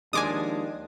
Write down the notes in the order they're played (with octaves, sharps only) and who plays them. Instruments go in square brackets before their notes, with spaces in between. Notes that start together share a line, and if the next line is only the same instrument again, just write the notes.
[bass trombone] D#2 [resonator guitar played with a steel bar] F3 G#3 D4 [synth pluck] G#5 D6 D#6